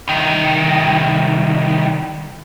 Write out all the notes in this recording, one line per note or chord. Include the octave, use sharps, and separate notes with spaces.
C2 D#3